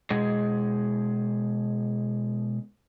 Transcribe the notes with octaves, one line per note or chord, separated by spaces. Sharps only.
B2 G#3 G#4